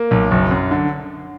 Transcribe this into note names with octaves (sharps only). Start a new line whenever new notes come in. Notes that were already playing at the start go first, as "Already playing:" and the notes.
Already playing: A#3
B1
F#1
F#2
D3